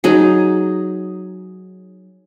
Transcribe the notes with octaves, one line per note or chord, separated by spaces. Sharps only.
F#3 D#4 G#4